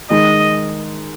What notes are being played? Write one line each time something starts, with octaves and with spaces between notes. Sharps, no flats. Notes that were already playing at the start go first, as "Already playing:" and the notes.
D#3 G#3 D#4 D#5